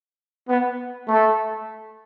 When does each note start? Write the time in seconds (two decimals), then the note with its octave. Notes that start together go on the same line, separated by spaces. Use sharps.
0.49 B3
1.08 A3